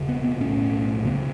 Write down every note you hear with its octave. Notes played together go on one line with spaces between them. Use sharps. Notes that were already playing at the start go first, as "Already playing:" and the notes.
Already playing: E1 C#3
B3
B3
B1 A2 C#4
E2 C#3 B3